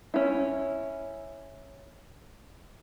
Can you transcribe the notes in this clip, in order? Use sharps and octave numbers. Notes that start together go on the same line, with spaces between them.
C#4 E4